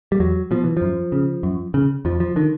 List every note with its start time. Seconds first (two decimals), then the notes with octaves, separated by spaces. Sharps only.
0.12 G3
0.20 E2 F#3
0.51 B2 F3
0.64 E3
0.77 F#2 F3
1.12 C#3
1.43 F#2
1.74 C#3
2.05 F2 F3
2.20 F3
2.36 D3 D#3